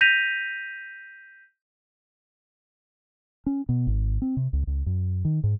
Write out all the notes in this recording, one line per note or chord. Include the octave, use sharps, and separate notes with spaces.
G6 A#6 B6 D#7 F7
C#4
B2
G#1
C4
C3
C#2
C#2
F#2
D#3
G#2